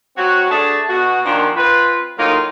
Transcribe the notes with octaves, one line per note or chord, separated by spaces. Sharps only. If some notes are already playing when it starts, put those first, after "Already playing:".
F#3 C4 F#4
A3 D4 G#4 A5
B2 F#4
A#2 D#3 F3 D4 F#4
C4 F4 B4
A2 F#3 A#3 D#4 F4